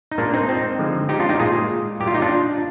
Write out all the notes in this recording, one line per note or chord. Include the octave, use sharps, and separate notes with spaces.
D#4
A#2 G#3 A#3 D4
C4 D#4
C4 D#4
D3 F3 G#3
D#4 G4
D4 F4
D#4 G4
A#2 G#3 F4 G#4
A#2 G3 G4
F4
D#4
D4 F4